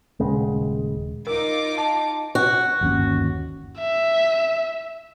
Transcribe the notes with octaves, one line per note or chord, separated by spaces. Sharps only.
D#1 C#3 G#3
D#4 F4 A#4 D6
A5
F#4
G1 D#2 C#4
E5